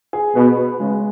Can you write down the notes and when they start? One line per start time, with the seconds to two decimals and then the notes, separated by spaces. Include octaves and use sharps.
0.13 G#4
0.35 B2 B4
0.57 B4
0.79 C#3 G#3